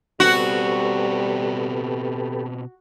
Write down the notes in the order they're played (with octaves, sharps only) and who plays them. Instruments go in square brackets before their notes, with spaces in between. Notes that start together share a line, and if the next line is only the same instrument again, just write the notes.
[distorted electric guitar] B2 C4 [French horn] G3 [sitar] F#4 [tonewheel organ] G4 A4 B4